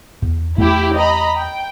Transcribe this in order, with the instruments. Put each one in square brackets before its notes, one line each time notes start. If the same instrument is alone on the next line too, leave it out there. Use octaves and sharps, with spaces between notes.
[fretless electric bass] E2
[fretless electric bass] E2 A3 [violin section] E4 G4
[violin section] D#5 A#5 B5
G5